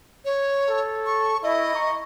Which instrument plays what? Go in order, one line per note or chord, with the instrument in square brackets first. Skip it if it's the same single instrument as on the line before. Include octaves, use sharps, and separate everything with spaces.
[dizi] C#5
[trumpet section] A4
[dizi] C#6
[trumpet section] E4 [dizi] D#5
[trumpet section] A#5 C#6